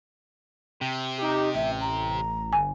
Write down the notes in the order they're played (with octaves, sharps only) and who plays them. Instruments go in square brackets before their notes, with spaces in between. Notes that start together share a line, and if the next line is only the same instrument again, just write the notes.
[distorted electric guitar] C3
[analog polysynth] D#4 G4
[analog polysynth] A1 [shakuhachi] E5
[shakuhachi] A#5
[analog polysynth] G1 [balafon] G#5